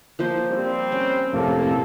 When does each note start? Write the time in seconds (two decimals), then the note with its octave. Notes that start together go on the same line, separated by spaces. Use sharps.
0.19 F3 A#3 C5
0.50 G3 C4
0.92 C#4
1.33 F2 A2 C3 A#3 A4